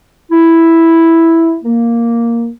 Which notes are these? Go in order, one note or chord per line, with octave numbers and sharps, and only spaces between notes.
E4
A#3